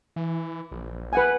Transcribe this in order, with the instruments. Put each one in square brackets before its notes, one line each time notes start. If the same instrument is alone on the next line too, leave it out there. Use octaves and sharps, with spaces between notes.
[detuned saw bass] E3
A#1
[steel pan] B4 F#5 G#5